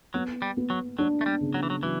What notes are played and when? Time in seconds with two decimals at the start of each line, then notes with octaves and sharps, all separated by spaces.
0.14 F#3 B3
0.42 G3
0.57 B3
0.70 F#3
0.99 F#3 D4
1.21 A3
1.26 G3
1.41 C#3
1.54 F#3
1.63 E3
1.70 F#3
1.83 E3 F#3